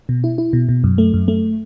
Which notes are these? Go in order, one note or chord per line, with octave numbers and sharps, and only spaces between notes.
B2
E4
E4
B2
B2
F#2
A3
F#2
A3